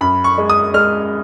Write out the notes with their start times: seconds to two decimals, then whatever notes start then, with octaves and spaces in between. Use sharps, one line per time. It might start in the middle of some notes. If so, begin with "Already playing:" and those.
0.01 F#2 B5
0.24 C#6
0.38 G#3
0.50 D#6
0.74 G#3 F6